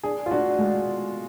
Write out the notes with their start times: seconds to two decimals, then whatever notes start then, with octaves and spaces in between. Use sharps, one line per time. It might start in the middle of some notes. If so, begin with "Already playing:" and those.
0.04 D4 G#4
0.26 F4
0.31 D4 F#4
0.58 G#3 A3
0.86 B2